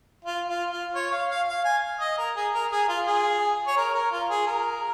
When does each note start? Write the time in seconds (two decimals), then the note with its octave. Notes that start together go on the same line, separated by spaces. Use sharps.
0.25 F4
0.48 F4
0.71 F4
0.95 C#5
1.12 F5
1.30 F5
1.48 F5
1.65 G#5
2.00 D#5
2.18 A#4
2.36 G#4
2.54 A#4
2.71 G#4
2.89 F4
3.07 G#4
3.67 C#5
3.77 A#4
3.94 A#4
4.11 F4
4.30 G#4
4.47 A#4